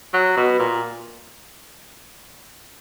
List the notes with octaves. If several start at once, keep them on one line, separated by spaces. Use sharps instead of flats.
F#3
B2
A#2